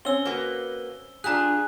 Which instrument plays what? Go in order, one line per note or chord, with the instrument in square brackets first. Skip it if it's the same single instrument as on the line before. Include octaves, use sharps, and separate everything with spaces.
[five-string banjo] C4 C#4 [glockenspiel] E6 G7
[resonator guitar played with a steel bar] A#3 F#4 B4
[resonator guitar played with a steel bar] D4 F4 G4 [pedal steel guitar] G#4 [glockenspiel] A#5 F#6